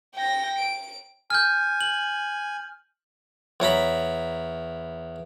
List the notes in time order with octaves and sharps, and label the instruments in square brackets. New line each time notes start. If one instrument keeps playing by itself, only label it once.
[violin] G5 A#6
D7
[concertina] G#5 [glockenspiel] F6 G6
[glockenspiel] F#7
[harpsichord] E2 C#5 A#5 B5